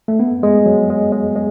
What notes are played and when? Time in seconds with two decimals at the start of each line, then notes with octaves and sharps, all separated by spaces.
0.08 A3
0.19 B3
0.43 G#3
0.66 F#3
0.90 G#3
1.12 G#3
1.36 G#3